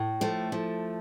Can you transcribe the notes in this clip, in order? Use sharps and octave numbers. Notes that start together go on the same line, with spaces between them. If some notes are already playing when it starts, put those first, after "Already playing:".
Already playing: A2
F3 A3
F3